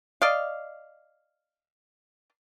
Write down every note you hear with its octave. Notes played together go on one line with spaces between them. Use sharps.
D5 D#5 F5